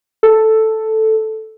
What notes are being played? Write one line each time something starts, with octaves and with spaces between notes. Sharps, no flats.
A4